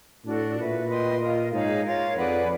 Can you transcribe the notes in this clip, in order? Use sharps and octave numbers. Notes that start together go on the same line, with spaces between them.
A2 D4 F#4 A4 D5
A#2 F#4 B4 E5
B4 D#5 G5 C6
F4 A#4 D#5
G#2 D#4 G#4 C#5 F5
F4 A#4 C#5 F5
F2 G#4 B4 D5 F#5